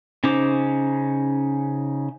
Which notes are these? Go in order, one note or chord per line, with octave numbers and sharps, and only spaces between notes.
C#3 C#4 D#4 C5 D6